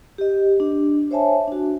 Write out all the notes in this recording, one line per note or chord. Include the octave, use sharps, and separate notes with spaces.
G4 D#5
D4
C5 C#5 E5 G#5 A5
D4 F#4